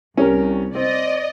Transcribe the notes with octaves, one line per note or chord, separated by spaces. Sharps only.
C2 C#4 G4 A#4
C4 D5 D#5